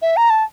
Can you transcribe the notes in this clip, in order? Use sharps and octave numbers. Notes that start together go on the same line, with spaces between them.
E5
A#5
A5